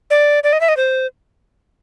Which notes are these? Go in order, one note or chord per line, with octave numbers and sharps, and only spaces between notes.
D5
D5
D#5
E5
D#5
C5